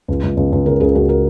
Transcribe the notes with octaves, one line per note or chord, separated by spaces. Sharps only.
C#2
C#2
C#2
C#2
C#3 A#4
C#2 G#4
C#2 F#4
A#4